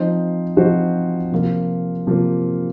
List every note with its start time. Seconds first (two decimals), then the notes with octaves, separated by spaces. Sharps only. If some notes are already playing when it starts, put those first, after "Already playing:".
Already playing: F3 C4 D#4 C5
0.57 F3 C4 D#4 F#4 C5
1.32 C3 F3 A#3 F4 A#4
2.07 C3 F3 A#3 F4 A#4